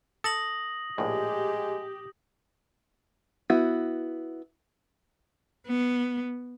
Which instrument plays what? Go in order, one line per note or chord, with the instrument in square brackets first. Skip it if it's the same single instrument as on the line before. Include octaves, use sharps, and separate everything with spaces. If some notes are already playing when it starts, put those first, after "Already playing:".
[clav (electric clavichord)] A4 [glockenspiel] D#6 A#6 F#7
[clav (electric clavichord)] A#1 A2 [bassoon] G#3 [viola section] G4
[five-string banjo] B3 E4 F#4
[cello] B3